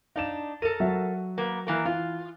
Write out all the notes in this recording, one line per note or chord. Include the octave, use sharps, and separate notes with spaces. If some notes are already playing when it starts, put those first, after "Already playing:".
D4 D#4 F5 E7
A4 A#4 D#7
F#3 F#4 E5
A#3 B3
E3 A#3 A#4
E3 F4